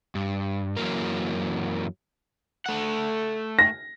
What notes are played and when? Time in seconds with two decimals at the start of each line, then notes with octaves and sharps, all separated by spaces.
0.15 G2
0.77 F#2 E3 F#3 A#3 A#4
2.66 A3 F#5
3.59 A#6